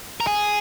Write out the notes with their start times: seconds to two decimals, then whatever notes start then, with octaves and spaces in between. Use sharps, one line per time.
0.20 A#4
0.27 G#4